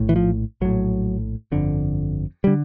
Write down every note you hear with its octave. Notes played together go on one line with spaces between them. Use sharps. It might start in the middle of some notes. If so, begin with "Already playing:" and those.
Already playing: A#1 A2
E3
F3
A#1 A2 F#3
G1 F2 D3
D3 G3